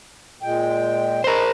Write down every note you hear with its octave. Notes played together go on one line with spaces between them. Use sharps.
A#2 G#3 G5
D#4 A#4 C5